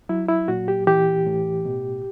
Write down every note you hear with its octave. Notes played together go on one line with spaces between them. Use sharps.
F#3 E4
E4
A#2 F#4
G4
E3 G4
A2
B2